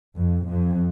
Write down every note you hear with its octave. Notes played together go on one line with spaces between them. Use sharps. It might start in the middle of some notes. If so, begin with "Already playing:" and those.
F2
F2